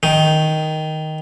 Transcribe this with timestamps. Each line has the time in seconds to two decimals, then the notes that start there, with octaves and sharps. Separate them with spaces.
0.03 D#3